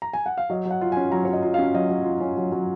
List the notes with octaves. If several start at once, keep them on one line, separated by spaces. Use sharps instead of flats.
A#5
G#5
F#5
F5
F#3 D#5
F#3
F#5
F4
G#5
C#4
F#3 A#5
C#5
F#3
D#5
F4
F5
C#4
F#3 D#5
F#3
F4
C#4
F#3
F#3